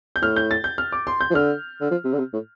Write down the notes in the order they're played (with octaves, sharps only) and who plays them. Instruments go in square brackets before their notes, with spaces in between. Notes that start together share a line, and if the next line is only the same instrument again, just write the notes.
[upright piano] G6
[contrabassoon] A2 [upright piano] F6
[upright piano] G6
A6
G6
F6
D6
C6
G6
[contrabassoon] F3
[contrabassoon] D3 [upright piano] F6
[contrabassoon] D3
F3
C3
D3
C3
A2